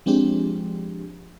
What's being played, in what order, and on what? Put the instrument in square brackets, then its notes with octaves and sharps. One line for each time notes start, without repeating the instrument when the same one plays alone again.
[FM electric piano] F3 G#3 C4 D4 G4